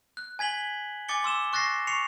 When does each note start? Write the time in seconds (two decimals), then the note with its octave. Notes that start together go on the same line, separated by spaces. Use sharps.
0.17 F#6
0.39 G#5 G#6 B6 F#7 G7
1.08 G#5 D6 A6 C#7 G7
1.24 C6 E6 E7 G7
1.53 C#6 F#6 A6 A#6 C7
1.87 C#6 C7 C#7 F7